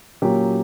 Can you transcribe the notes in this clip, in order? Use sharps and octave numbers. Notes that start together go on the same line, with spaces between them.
A#2 F#3 A#3 C#4 G4